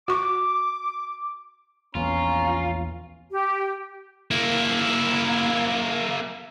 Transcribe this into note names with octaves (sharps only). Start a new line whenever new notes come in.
F#4 C#6 D6
A#1 E2 B3 C#4 F4 A#5
G4
A#3 E4